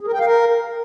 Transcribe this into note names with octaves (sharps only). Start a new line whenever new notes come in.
G#4
A#4
G5
F5
A#4